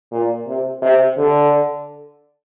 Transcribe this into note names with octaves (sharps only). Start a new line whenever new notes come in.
A#2
C3
C3
D3